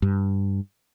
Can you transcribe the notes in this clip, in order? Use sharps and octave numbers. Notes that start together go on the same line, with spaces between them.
G2